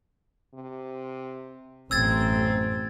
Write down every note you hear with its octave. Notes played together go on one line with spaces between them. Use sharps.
C3
A1 F#2 B2 C4 E6 G#6 A6